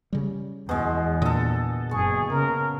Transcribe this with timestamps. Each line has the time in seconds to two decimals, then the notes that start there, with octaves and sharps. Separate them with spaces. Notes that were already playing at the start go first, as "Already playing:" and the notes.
0.13 C#3 G3
0.69 E2 B2 G#3
1.22 A#2 D3 A4 D#5
1.91 F#1 G#4 C#6
2.30 C#3 A#4